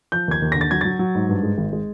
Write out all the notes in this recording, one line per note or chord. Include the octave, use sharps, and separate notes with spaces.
F3 G6
D#2 G#6
D#2
D3 A#6
A6
F#3 G#6
F#3 A6
F#3
G#2
G2
G#3
G#1
G#3